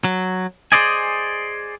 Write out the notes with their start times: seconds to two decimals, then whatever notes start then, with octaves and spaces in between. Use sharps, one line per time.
0.04 F#3
0.72 G#4 A4 C5 D5 D#5 G#5